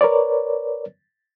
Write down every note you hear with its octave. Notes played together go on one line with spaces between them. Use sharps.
A#4 B4 C#5 D5